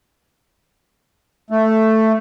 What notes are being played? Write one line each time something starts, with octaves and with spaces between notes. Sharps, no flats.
A3